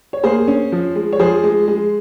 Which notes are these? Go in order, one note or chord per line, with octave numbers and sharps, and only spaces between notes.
C#5
A#3 G#4 C5
C#4
F3
G#3
C#5
F3 G#4 C5
G#3
G#3